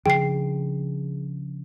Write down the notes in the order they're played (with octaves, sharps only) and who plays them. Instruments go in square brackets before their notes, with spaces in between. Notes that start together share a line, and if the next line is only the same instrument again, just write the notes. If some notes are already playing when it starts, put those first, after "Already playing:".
[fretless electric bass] C#3 F3 D4 [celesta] G#4 [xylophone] G5 C7